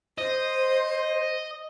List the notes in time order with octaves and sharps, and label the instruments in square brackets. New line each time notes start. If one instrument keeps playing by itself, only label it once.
[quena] C5 [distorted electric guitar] D#5